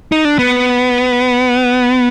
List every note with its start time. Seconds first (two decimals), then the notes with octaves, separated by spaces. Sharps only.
0.12 D#4
0.25 D4
0.39 B3